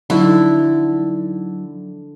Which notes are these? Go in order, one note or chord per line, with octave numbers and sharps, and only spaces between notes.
D3 F3 F#3 D#4 E4